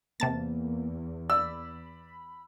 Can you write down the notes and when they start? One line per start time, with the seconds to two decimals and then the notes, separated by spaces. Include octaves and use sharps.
0.20 E2 C3 A#3 A5 A6
1.29 D5 B5 E6